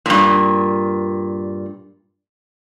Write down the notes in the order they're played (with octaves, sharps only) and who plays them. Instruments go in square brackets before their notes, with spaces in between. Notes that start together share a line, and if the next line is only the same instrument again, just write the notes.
[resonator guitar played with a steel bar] G2 A#2